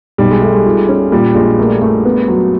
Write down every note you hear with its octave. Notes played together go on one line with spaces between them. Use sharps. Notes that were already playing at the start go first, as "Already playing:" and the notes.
B1 G3
G#3
G3 A3
G#3
F4
C#4
A#2 G3
A#1 G#3
A3 A#3
A3
B3
F#3